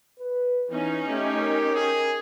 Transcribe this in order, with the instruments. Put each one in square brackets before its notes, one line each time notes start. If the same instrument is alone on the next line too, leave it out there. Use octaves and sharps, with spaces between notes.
[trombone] B4
[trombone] E3 [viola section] C#4 D#4
[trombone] A3 [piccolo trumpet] G4
[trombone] A#4
[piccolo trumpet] G#4